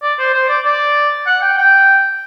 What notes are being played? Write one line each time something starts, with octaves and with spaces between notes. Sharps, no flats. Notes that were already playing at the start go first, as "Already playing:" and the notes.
D5
C5
C5
D5
D5
F#5
G5
G5